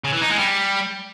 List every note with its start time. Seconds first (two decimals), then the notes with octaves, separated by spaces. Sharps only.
0.04 C#3
0.13 E3
0.21 D#4
0.30 G#3
0.38 G3